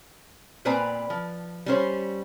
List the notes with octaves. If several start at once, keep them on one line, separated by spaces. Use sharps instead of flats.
A#2 C4 B4 D5 G#5 A#5
F3
G3 C#4 C5